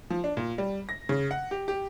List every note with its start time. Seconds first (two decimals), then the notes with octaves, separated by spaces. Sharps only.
0.10 F3
0.24 D4
0.37 A#2
0.58 G3
0.89 A#6
1.09 C#3
1.31 F#5
1.51 G4
1.68 G4